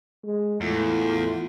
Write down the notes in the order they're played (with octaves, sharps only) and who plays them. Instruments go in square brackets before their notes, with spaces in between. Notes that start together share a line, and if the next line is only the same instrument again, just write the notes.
[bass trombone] G#3
[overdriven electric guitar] E2 [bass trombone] A2 [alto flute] F4